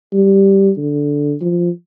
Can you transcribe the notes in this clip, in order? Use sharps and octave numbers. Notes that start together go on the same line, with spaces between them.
G3
D3
F3